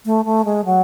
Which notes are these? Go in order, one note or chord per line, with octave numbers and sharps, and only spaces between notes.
A3
A3
G#3
F#3